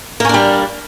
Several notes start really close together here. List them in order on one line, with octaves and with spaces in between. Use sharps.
A#3 C#4 D4 G3